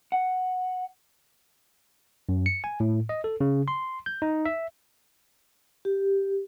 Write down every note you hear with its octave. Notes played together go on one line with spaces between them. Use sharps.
F#5
F#2
C#7
G#5
A2
D#5
A4
C#3
C6
G6
D#4
E5
G4